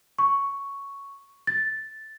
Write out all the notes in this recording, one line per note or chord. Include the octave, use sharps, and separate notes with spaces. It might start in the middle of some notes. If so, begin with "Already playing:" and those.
C#6
A6